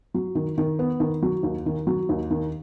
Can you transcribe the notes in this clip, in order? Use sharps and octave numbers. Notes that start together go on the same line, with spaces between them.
F#3
D#3
D#3
B3
D#3
F#3
D#2
D#3
F#3
D#2
D#3